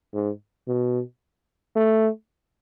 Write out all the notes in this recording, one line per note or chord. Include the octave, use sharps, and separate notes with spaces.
G#2
B2
A3